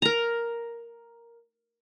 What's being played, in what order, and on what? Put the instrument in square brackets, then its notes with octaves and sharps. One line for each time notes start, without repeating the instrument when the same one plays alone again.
[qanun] A#4 A#5